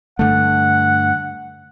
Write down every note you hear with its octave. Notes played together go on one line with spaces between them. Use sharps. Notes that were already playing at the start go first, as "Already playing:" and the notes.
G2 D3 A3 F#5